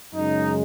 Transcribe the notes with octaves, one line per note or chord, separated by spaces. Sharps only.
F#2 C#3 G#3 D#4